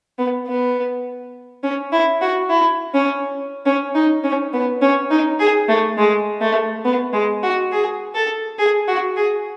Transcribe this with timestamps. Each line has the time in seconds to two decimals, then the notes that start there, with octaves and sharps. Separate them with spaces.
0.18 B3
0.47 B3
1.63 C#4
1.93 E4
2.21 F#4
2.50 E4
2.94 C#4
3.66 C#4
3.95 D#4
4.24 C#4
4.53 B3
4.82 C#4
5.11 D#4
5.40 G#4
5.69 A3
5.98 G#3
6.41 A3
6.85 B3
7.13 G#3
7.43 F#4
7.72 G#4
8.15 A4
8.59 G#4
8.88 F#4
9.17 G#4